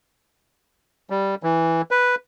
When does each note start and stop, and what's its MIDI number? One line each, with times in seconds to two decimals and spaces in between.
1.10 1.35 55
1.43 1.82 52
1.91 2.15 71